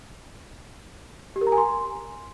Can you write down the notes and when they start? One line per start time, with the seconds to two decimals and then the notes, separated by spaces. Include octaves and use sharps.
1.36 G4
1.41 A#4
1.47 A#5
1.52 G#5
1.58 C6